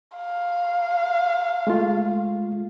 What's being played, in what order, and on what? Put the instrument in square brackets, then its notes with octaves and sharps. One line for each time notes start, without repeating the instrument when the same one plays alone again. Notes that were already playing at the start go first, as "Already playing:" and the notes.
[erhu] F5
[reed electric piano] G#3 A3 F4